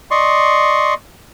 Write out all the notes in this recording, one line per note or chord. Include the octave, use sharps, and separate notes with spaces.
D5 D#5 C6 C#6